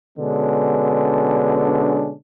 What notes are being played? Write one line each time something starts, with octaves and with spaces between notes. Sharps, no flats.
B2 D3 G#3 C#4 D4